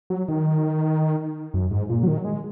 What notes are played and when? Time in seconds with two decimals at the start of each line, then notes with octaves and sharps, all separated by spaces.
0.10 F#3
0.28 D#3
1.54 F#2
1.71 G#2
1.89 A#2
2.03 F#3
2.08 D#3
2.17 F#3
2.25 G#3